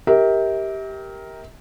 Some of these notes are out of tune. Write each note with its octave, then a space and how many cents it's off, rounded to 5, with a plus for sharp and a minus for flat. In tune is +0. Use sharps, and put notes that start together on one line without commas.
G4 +0 A#4 +0 E5 -40